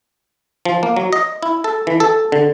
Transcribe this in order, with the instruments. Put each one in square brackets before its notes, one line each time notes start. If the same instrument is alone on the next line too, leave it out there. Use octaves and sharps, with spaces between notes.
[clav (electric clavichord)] F3
A#3
F#3
D#5
E4
A4
E3
A4
D3